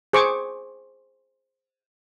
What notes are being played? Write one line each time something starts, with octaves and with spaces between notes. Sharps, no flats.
G#4 C5 C#6 D6